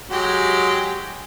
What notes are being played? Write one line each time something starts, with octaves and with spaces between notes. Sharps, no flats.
F#3 G#3 G4